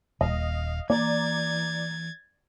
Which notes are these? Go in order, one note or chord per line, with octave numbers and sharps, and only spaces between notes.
D#1 D#5 F5
E3 A#3 D5 A#5 G#6 A6